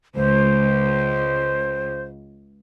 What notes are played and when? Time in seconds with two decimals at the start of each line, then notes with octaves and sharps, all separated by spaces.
0.15 C#2 C5